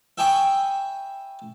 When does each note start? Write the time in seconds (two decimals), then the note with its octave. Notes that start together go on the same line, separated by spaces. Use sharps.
0.18 E5 G5 G#5 B5 C#6 D#6